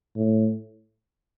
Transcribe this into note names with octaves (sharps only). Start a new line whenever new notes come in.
A2